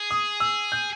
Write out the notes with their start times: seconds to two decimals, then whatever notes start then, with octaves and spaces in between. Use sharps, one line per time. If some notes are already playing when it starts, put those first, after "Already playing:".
Already playing: G#4
0.11 D#6
0.40 E6
0.72 G6